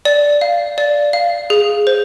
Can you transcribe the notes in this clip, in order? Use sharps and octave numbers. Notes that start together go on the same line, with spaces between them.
D5
F5
D5
F5
G#4
C5